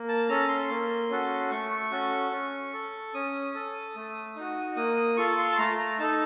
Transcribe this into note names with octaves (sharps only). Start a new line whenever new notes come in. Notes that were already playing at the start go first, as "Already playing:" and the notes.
Already playing: A#3
A5
C#4 A4 A#5
C6
A#3
C#4 F#4 A4
A3 C#6
C#4 F#4 A4
C#4
A4
C#4 D#6
A4
A3
D#4 F#4
A#3 D#6
D#6
F4 A4 C#6
C6
A5
A3 A#5
A#5
D#4 A4 A5